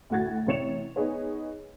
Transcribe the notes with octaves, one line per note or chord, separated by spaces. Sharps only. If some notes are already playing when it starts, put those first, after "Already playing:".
D2 A2 F#4 G#6 A6
A1 C3 C#5 C#7 E7 F7
B3 D#4 G#4 C#5